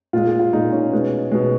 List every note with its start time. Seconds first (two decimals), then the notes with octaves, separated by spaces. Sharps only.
0.13 A#2 G#3 F4
0.26 G#4
0.39 F4
0.53 A#2 G#3 D#4
0.72 C#4
0.92 B2 G#3
1.31 B2 G#3